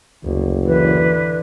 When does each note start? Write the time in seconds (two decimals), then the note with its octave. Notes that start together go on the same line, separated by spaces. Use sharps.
0.24 F#1 D2
0.66 D3 E3 B4